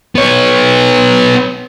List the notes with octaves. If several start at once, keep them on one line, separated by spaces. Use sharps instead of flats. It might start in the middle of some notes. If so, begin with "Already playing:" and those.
B3 C#5